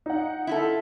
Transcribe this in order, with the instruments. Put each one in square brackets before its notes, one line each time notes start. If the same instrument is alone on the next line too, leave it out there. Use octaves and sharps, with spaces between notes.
[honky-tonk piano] D#4 F#5
[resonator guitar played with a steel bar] E4 F4 A4